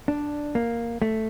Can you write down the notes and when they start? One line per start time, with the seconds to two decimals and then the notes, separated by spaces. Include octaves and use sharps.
0.08 D4
0.55 A#3
1.02 A3